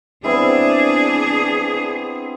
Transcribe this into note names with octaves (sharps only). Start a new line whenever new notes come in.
B3 C4 D4 E4 G#4